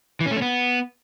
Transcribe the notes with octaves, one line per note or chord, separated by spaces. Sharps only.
E3
C#4
A3
C#4
B3